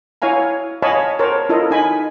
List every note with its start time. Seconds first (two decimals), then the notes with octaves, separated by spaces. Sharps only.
0.22 E4 C#5 F5 G#5 A#5
0.82 C#5 D#5 F5 G#5 A5 B5
1.19 A#4 C5 C#5 A5
1.49 E4 F4 A4 A#4 D#5
1.71 D#4 G#5 B5